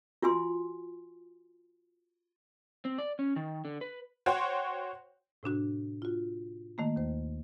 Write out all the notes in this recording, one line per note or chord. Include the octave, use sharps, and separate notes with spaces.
F4 F#4 G#5 C6
C4
D5
C#4
D#3
D3
B4
F#4 C5 C#5 F#5 G5
A2 C3 D4 F#4
F4 F#4
D#3 A3 A#3
D#2 C5